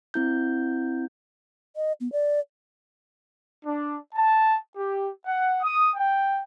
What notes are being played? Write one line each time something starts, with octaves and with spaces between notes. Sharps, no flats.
C4 E4 G6
D#5
B3
D5
D4
A5
G4
F#5
D#6
G5